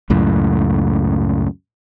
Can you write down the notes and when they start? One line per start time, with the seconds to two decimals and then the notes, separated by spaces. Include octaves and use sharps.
0.10 C#2 F#2 A2